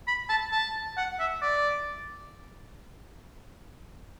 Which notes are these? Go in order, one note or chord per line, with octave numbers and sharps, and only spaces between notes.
B5
A5
A5
F#5
E5
D5